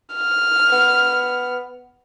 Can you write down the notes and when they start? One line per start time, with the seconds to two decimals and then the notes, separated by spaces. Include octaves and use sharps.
0.14 F6
0.73 B3